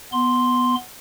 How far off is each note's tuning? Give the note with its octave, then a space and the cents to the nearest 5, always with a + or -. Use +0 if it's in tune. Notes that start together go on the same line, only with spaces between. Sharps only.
B3 +0 C6 +0